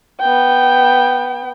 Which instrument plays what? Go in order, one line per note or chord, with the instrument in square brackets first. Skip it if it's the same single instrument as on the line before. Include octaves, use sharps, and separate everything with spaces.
[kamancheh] B3 G5